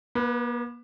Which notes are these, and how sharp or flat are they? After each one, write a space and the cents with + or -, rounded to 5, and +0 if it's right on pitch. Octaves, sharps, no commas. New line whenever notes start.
A#3 +45 B4 +0